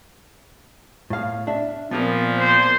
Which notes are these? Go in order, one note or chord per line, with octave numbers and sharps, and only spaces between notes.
A2 F5
D4 E5
A#2 F3 B3 C4 A#4
C5